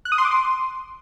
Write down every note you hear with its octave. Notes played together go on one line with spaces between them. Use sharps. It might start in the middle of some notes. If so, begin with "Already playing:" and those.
F#6
D#6
C6
D6
C6